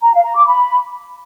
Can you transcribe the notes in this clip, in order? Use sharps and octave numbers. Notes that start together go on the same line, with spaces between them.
A#5
F5
A#5
D6
B5